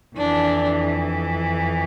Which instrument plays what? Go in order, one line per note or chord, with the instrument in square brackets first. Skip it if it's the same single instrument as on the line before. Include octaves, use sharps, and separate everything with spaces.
[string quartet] F2 E3 D4